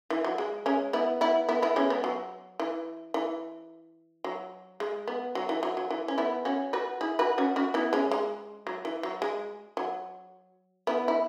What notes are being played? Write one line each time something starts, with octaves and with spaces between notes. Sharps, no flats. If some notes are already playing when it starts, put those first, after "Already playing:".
E3
F#3
G#3
G#3 C#4
B3 E4
B3 E4
B3 E4
B3 E4
G#3 C#4
B3
F#3
E3
E3
F#3
G#3
B3
F#3
E3
F#3
F#3
E3
C#4
B3 E4
C#4 F#4
F#4 B4
E4 G#4
F#4 B4
C#4 F#4
C#4 F#4
B3 E4
G#3 C#4
G#3
F#3
E3
F#3
G#3
F#3
B3 E4
E4